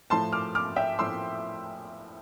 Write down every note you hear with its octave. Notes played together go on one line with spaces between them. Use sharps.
A2 F3 A3 A5 C6
D6 F6
D6 F6
E5 G5
A2 F3 A3 C6 E6